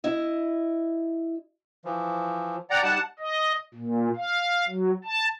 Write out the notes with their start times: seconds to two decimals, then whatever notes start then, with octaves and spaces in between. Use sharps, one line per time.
0.04 E4 D#5
1.85 E3 F3
2.70 D5 F#5 G5 A#5
2.83 G3 D#4 G4 F#5 A5
3.19 D#5
3.74 A#2
4.16 F5
4.68 F#3
5.05 A5